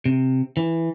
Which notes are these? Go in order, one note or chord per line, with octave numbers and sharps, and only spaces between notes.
C3
E3